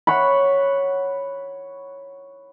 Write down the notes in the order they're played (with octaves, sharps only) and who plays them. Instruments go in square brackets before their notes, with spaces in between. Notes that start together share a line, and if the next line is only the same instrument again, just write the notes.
[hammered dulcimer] C#5 F#5 B5